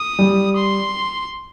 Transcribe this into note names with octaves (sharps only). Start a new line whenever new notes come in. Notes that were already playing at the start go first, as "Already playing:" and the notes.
Already playing: D#6
G3
C6